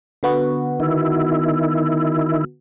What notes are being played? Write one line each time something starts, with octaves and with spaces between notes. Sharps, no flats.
D3 B3 F#4
D#3 E4